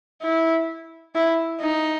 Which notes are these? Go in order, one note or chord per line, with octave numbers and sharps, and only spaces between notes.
E4
E4
D#4